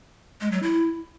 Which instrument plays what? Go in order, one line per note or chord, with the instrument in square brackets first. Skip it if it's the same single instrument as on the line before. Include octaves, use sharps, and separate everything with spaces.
[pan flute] G#3
F#3
E4